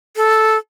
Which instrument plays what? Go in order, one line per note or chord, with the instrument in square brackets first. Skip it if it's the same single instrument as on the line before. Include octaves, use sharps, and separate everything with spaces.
[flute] A4